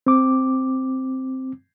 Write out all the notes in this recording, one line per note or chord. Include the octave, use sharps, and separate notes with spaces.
C4 D6